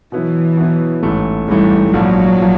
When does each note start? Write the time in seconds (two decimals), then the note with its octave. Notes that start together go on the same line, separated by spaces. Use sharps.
0.12 B2 E3 F#3 B3 E4
0.57 B2 F#3 B3 E4
1.03 A1 G#2 E3 A3
1.48 A1 G#2 E3 G3 A3
1.93 A#1 G#2 F3 F#3
2.42 F3